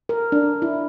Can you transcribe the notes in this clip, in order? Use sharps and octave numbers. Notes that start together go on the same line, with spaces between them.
A#4
D4
E4